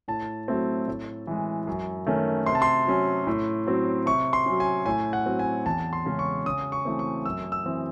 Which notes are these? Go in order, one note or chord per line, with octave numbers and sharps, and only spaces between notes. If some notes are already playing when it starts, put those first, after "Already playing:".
A2 A5
F#3 A3 C4
A2
E3 G#3
F#2
D#3 A3 C#4
C3 C6
A5
C6
F#3 C#4
A2
F#3 C4
C3 C#6
C6
F#3 C#4
G#5
A2 G#5
F#5
F#3 C4
G#5
E2 A5
C6
C#3 G#3 C#4
C#6
C#3 D#6
C#6
E3 A3 C4
C#6
F#2 E6
E6
E3 C4